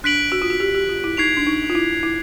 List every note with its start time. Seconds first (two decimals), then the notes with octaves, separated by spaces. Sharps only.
0.04 D4 F#6 B6 D7 F#7
0.32 F#4
0.42 F4
0.50 F#4
0.60 G4
0.75 G4
0.89 F4
1.04 E4
1.17 D#4 G#6 C7 F7
1.37 D4
1.47 D#4
1.70 F4
1.75 E4
2.03 E4